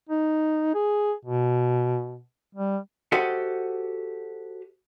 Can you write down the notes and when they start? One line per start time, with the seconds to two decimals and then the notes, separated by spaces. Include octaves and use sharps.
0.09 D#4
0.75 G#4
1.25 B2
2.55 G3
3.12 F#4 G4 A4 C5 D#5 F#5